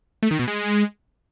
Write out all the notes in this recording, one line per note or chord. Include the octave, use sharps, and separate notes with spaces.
A3
D#3
B2
G#3